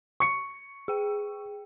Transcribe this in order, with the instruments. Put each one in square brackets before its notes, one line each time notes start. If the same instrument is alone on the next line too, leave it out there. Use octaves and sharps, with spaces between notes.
[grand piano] C#6 C#7
[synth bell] G#4 G5